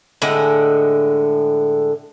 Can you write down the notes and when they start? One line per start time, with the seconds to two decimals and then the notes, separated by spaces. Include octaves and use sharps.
0.22 A2 D3 G#3 F#5